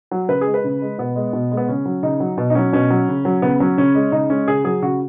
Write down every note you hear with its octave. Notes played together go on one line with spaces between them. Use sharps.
F#3
C#3 B4
G#3 G#4
B4
C#3
G#3
B2 B3
G#3
B2
G#3
B3
C#3 C#4
F#3
C#3 D#4
F#3
B2
D#4
F#3 C#4
B2 C#4
F#3
C#3
F#3
C#3 B3
F#3 C#4
C#3 C#4
G#3
C#3 D#4
G#3 C#4
C#3 G#4
F#3 G#4
C#3 F#4